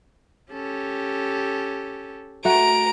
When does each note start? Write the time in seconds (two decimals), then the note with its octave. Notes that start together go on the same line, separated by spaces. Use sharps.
0.52 C#4 G4 A4
2.45 A3 F#4 A#5 D7